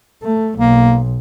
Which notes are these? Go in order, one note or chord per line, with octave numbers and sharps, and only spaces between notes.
A3
B1 A#3